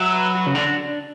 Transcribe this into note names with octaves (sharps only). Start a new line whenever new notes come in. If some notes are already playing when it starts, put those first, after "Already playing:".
Already playing: F#3 E5
B4
F#4
C#3
D3 D4